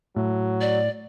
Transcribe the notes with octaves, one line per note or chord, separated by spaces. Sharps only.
A2 F#3
D5